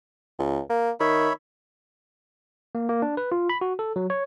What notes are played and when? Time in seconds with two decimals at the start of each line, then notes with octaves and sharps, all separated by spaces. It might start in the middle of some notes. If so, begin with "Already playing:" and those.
0.39 C#2
0.70 A#3
1.00 D#3 C#5 E5 B5
2.75 A#3
2.89 A#3
3.02 D4
3.17 B4
3.32 F4
3.49 B5
3.61 F#4
3.79 A4
3.96 F#3
4.10 C#5